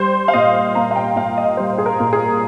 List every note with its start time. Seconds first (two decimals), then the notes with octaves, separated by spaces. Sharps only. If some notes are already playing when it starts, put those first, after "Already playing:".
Already playing: G3 C5
0.28 F5
0.33 A#2 D#5
0.75 A#3 A#5
0.91 F5
0.96 G5
1.16 A#2 F5
1.37 D#5
1.57 G3 C5
1.78 G#4
1.86 A#4
2.00 A#2
2.13 G#4